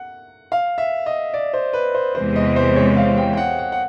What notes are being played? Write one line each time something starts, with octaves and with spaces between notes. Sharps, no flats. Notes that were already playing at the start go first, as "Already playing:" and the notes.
Already playing: F#5
F5
E5
D#5
D5
C5
B4
C5
E2 C3 E3 G#3 C4 C5
D#5
C5
C#5
F5
G5
G5
F#5
F#5
F#5